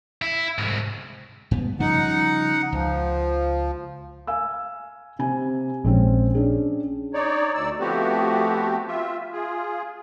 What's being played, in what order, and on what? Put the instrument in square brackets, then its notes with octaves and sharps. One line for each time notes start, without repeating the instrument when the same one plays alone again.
[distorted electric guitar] E4
C2 G#2
[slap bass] G2 B3
[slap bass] C#3 F3 G3 [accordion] D#4 F#5
[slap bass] C#2 [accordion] F3
[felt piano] F5 G#5 E6
C3 G#5
[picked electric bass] A#1 [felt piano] G#3 C4 C#4
[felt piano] C#4 D4 G#4
[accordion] D#4 C#5 D5
D2 D5 E6
F3 A3 B3 C4 F#4 G4
F4 E5
F4 G#4